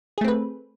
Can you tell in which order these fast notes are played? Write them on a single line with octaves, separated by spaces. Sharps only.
G#4 A3 C4 B4